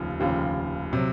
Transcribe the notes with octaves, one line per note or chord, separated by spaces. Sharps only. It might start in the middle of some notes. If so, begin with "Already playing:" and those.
Already playing: F1 D#2 C#3 F3
F1 D#2 C#3 F3
C3 F#3